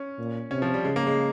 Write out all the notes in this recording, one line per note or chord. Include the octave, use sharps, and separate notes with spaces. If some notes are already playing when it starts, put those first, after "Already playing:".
Already playing: C#4
A#2
C3 C#4
F3
G3
C#3 G#3
A#3
G#3